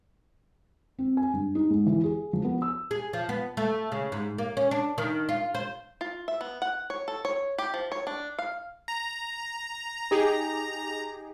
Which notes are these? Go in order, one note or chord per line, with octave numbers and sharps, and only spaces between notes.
C4
G#5
G2
D#4
G#2
E3
G#4
F3
B3
E6
G#4
F3
B3
A3
C#3
G#2
A#3
C#4
D4
D#3
F4
C5
F4
E5
B3
F#5
C#5
A4
C#5
G4
F3
C#5
D4
F5
A#5
D#4 G4 G#4